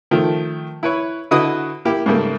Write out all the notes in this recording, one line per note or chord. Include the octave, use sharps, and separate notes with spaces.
D#3 F3 A3
E4 B4 C#5
D3 E4 F#4 B4 D#5 D#6
A#3 E4 G4
G#2 C#3 G3 A3 A#3